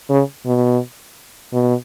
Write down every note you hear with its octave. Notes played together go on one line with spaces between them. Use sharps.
C#3
B2
B2